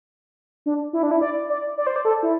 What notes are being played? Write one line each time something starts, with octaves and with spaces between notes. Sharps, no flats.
D4
E4
D4
E4
D5
D5
D5
C5
D5
A4
E4